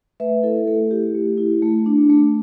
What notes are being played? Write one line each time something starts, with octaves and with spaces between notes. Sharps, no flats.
A3 B4 E5
E4 A4
A3 A4
E4 G4
A3
E4
A3
D4
A3